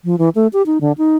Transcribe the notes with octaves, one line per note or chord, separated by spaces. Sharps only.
F3
E3
A3
G4
D#4
D3
D#4